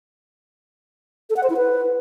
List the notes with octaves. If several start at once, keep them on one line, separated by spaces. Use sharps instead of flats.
A4
F#5
C5
E4
B4